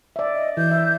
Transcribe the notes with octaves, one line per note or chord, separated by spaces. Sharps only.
D5 E5
D#5
E3 G6
E5